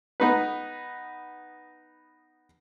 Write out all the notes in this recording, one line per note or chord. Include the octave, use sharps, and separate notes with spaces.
B3 D#4 B4